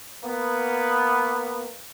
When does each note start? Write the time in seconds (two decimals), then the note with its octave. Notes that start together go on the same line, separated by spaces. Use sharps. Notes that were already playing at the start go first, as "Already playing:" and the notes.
0.24 A#3 B3